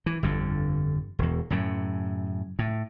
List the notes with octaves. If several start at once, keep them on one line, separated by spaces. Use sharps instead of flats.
E3
G1 F2 D3
E1 E2
F#2 A2 C#3
A2